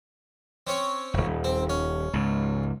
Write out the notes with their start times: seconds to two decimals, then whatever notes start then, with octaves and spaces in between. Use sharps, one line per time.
0.67 C4 C#4 C#5
1.14 D#1 G#1
1.44 C4
1.69 C#4
2.13 C#2 G#2